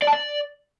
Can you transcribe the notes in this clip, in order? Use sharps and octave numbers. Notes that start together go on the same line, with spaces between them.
D5
A5
D5